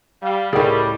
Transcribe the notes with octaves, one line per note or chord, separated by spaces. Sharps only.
G3 F5
C#2 A2 G3 G#4 A#4 G5